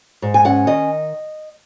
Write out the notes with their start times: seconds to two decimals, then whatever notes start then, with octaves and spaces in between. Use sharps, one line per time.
0.22 G#2
0.34 G#5
0.45 C#4 F#5
0.67 D#3 D#5